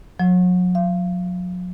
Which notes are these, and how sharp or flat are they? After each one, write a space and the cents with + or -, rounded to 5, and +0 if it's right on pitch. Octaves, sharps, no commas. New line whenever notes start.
F#3 -40
F5 -30